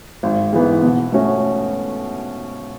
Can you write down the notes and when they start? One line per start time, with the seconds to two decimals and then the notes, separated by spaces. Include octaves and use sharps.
0.23 G#1
0.53 G#2 E3 B3
0.82 B2
1.12 A3 C#4 F#4